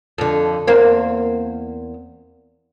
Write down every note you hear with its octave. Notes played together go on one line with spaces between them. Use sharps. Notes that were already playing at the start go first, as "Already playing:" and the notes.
F2 D3
E2 A#3 C4